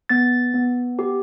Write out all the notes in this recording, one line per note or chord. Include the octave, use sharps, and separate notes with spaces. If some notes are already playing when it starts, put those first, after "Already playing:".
B3 A6
B3
G4